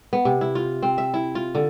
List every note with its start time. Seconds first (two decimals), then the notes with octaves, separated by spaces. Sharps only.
0.13 B3
0.25 C3
0.41 E4
0.55 F4
0.82 C4
0.98 E5
1.14 E4
1.35 F4
1.55 D3